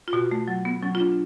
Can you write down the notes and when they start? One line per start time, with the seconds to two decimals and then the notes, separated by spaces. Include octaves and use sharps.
0.08 F4
0.13 B2 F#4
0.31 A3
0.48 F#3
0.65 B3
0.82 F#3 C#4
0.95 F4
1.00 D4